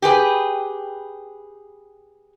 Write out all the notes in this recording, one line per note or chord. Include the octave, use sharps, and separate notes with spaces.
G4 G#4 B4